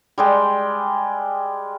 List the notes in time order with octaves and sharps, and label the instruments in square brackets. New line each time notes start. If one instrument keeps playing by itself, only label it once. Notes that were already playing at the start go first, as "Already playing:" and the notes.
[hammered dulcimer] G3 G#3 G5